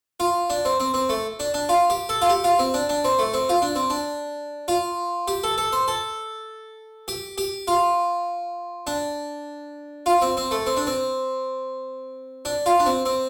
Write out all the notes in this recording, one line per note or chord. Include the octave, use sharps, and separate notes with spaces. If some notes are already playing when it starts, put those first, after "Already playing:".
F4
D4
C4
C4
C4
A3
D4
D4
F4
G4
A4
F4
G4
F4
C4
D4
D4
C4
A3
C4
F4
D4
C4
D4
F4
G4
A4
A4
C5
A4
G4
G4
F4
D4
F4
C4
C4
A3
C4
D4
C4
D4
F4
D4
C4
C4